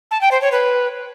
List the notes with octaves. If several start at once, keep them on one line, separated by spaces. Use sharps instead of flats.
A5
G5
C5
C#5
B4